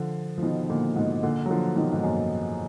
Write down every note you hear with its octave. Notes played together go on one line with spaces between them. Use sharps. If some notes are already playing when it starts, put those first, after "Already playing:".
Already playing: D3 F3
F3
B2 D#3
A#2 D3
G#2 B2
A#2 D3
F#3
D3 F3
B2 D#3
G#2
F#2 A#2